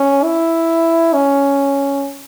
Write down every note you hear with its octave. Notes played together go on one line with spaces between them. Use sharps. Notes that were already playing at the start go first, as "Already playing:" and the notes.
Already playing: C#4
E4
C#4